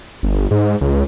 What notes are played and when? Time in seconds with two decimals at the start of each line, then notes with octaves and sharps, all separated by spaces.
0.23 G1
0.51 G#2
0.81 C#2